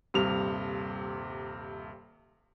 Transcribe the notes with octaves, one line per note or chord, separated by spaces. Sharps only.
D#1 G2 C3 F7